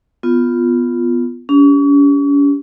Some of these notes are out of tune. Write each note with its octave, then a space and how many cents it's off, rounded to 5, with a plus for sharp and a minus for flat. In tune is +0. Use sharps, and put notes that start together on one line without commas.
B3 +5 F4 +0
C#4 +40 G4 +15